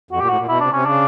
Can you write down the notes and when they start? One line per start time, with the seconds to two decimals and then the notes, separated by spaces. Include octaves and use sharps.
0.11 F2 F#4
0.20 A#2 G4
0.29 A2 F#4
0.38 A#2
0.48 B2 E4
0.60 C3 D4
0.72 C3 C#4
0.85 C#3 D4